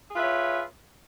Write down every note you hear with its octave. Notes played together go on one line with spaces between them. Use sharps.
F4 G#4 B4 C#5 E5